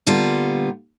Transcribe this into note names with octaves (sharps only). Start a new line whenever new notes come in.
A#2 D3 G3 B3 F4